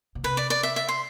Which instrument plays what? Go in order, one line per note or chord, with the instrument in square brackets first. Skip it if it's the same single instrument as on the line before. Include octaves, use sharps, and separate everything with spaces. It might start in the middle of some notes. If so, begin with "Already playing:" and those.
[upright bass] B2
[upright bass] C3 [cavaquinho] B4
[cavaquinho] D5
D5
E5
E5
C6